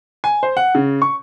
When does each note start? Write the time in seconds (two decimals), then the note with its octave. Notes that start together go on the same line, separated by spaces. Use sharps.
0.24 G#5
0.43 C5
0.57 F#5
0.75 C#3
1.02 C#6